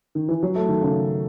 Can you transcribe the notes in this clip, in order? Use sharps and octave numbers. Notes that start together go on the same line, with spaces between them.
D#3
E3
F#3
A3
D#3
C#3